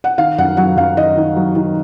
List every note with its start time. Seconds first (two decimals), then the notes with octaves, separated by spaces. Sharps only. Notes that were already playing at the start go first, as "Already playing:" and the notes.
0.04 F#5
0.18 D#3 F5
0.38 F#2 F#5
0.57 F#3 F#5
0.77 F#2 F5
0.97 D#3 D#5
1.17 D#3
1.36 F#3
1.55 D#3